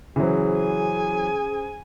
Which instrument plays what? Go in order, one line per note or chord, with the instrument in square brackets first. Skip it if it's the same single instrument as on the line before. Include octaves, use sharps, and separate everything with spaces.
[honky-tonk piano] C#3 C5 [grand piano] E3 F#3 [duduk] G#4
[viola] G#5